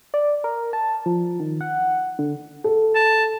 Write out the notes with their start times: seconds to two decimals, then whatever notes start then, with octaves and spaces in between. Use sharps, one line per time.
0.14 D5
0.44 A#4
0.73 A5
1.06 F3
1.40 D#3
1.61 F#5
2.19 D3
2.64 A4
2.95 A5